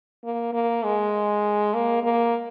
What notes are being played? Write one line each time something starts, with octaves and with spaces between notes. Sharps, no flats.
A#3
A#3
G#3
A#3
A#3